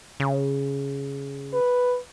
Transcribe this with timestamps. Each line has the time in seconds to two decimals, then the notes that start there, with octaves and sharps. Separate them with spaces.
0.20 C#3
1.54 B4